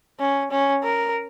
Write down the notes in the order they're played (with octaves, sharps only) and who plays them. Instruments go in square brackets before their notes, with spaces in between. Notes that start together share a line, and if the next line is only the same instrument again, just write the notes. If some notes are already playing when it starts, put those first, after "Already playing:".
[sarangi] C#4
C#4
A#4